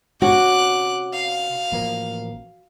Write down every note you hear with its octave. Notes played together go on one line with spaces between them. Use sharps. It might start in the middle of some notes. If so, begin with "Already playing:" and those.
C3 C#4 F#4 D6 F#6
F5
A1 F3 A#3